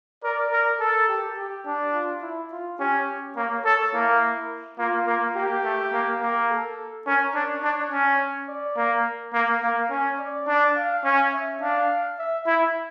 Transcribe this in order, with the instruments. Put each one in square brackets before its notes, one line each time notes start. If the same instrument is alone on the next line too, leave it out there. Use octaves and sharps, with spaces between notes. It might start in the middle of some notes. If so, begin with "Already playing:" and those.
[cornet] A#4 [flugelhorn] D5
[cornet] A#4
[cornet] A4 [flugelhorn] A#4
[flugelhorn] G4
G4
[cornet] D4
[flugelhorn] F4
E4
F4
[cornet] C#4 [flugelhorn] G4
[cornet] A#3 [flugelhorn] C#5
[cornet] A4 [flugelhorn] C#5
[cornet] A#3 [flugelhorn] E4
[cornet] A#3 [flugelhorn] F4
[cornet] A#3
[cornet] A#3 [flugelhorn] G4
[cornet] A3
A#3
A#3
[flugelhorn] A4
[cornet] C#4 [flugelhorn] A#4
[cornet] D4 [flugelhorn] C#5
[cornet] D4
C#4
[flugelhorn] D5
[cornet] A#3
A#3
[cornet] A#3 [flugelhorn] F5
[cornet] C#4
[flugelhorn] D5
[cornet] D4
[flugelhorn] F5
[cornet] C#4
[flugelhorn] E5
[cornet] D4 [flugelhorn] F5
[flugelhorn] E5
[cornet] E4 [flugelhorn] E5